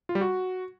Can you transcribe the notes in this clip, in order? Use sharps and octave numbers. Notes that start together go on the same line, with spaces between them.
F4
G3
F#4